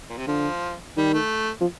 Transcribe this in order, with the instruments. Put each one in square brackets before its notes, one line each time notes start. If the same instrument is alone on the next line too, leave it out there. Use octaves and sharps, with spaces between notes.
[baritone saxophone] A#2
C3
[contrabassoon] D3 [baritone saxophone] F3
[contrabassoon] D#3 [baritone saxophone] G3
[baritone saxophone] A3
[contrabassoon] F3